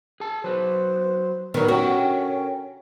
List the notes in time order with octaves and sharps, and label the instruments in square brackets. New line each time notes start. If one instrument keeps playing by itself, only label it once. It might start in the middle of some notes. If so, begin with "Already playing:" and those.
[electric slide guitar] G#4 A5
[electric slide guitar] F#3 B4 [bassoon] C5
[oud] D#3 F#3 [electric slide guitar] B3 [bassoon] B4
[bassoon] C#4 [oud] F#4 [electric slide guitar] A4 A#4 G5